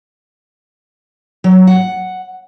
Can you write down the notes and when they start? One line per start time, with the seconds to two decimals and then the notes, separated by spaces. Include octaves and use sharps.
1.44 F#3
1.67 F#5